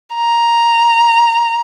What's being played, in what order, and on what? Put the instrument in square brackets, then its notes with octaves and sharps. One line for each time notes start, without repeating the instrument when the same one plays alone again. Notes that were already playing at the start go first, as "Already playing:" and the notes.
[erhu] A#5